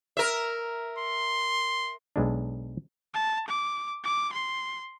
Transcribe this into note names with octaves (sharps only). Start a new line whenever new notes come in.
A#4 E5
C6
B1 G#3 D4
A5
D6
D6
C6